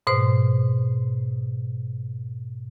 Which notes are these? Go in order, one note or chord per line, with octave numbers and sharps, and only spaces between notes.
G#2 B2 C5